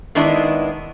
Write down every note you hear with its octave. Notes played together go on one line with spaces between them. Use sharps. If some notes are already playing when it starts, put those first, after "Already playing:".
D#3 G#3 B3 D4 E4